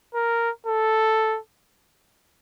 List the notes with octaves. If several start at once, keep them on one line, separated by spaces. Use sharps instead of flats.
A#4
A4